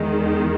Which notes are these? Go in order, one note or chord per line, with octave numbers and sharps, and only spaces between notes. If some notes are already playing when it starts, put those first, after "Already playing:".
Already playing: E2 D#3 G#3